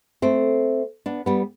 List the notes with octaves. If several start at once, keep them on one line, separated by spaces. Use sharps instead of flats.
A3 C4
B3 D4
G3 B3